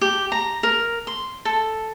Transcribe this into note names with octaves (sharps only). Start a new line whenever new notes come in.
G4
A#5
A#4
C6
A4